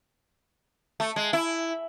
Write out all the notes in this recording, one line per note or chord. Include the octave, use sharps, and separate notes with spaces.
A3
G#3
E4